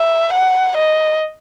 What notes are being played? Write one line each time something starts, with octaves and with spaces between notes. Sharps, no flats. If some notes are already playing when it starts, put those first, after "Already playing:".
Already playing: E5
F#5
D#5